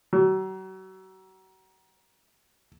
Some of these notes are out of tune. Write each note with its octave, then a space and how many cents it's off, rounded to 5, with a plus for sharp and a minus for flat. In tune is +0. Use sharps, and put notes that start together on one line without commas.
F#3 +35